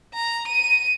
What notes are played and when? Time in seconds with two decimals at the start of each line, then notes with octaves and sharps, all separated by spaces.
0.14 A#5
0.47 D#7